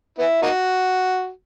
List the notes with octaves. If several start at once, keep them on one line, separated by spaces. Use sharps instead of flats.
B3 E4
A#3 D#4 F#4